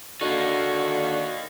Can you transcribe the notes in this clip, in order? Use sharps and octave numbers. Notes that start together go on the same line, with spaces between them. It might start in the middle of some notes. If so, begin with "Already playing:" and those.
D3 A#3 D#4 F#4